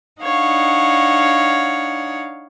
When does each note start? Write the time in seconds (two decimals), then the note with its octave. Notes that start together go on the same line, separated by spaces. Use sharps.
0.20 D4 D#4 C#5 F5 F#5